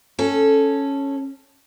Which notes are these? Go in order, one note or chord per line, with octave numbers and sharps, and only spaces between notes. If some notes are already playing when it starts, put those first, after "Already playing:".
C#4 A4